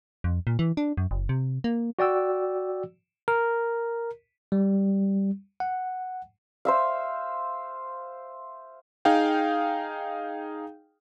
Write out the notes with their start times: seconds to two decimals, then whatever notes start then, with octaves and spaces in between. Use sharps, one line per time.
0.24 F2
0.47 A#2
0.59 E3
0.77 D4
0.97 F#2
1.11 F#1
1.29 C3
1.64 A#3
1.99 F#4 D5 G5 E6
3.28 A#4
4.52 G3
5.60 F#5
6.65 C5 E5 F5
9.05 D#4 G#4 F5 G5